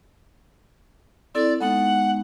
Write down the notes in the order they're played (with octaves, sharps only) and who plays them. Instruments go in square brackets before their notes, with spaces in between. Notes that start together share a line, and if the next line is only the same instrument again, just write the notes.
[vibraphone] C4 E4 A4 [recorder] D5
[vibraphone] G#3 B3 D#4 [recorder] F#5